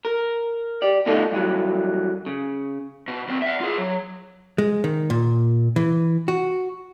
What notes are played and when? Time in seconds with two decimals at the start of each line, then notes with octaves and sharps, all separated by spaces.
0.05 A#4
0.82 G4 D5
1.06 B2 D3 A3 D#4 F4 A4
1.32 G2 E3 F#3
2.26 C#3
3.08 B2
3.28 D#2 C4
3.42 E5 F#5
3.61 F4 G#4
3.78 F#3
4.58 G#3
4.84 D#3
5.10 A#2
5.76 E3
6.28 F#4